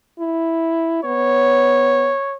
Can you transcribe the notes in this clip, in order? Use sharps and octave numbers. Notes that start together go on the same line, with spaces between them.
E4
B3 C#5